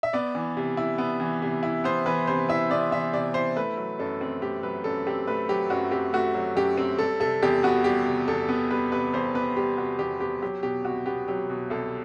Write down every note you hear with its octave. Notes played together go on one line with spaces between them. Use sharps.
E5
B3 D5
E3
C3
E4
B3
E3
C3
E4
B3 C5
E3 B4
C3 C5
E4 E5
B3 D5
E3 E5
C3 D5
E4 C5
A3 B4
F#3
F#2 A4
C4
A3 G4
F#3 B4
F#2 A4
C4 G4
A3 B4
F#3 G4
F#2 F#4
C4 G4
A3 F#4
F#3
F#2 G4
C4
G3 A4
C3 A4
E2 G4
B3 F#4
G3 G4
C3
E2 A4
B3
G3 B4
C3 B4
E2 C5
B3 B4
G3 G4
C3 F#4
E2 G4
B3 G4
F#3 G4
B2 G4
C2 F#4
B3 G4
F#3 G4
B2
C2 A4